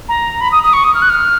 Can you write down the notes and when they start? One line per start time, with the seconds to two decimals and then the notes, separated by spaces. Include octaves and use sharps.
0.09 A#5
0.41 B5
0.52 D#6
0.63 D#6
0.73 C#6
0.84 D#6
0.94 F6
1.02 F#6
1.09 F6